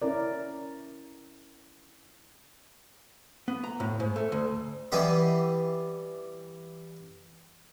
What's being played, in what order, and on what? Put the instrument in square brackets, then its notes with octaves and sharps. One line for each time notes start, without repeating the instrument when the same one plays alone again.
[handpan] C#4 E4 A#4 D5
[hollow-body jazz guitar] B3
A#5
A2
G#2
A3
D2
[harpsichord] E3 G3 B3 G4 D#5 C6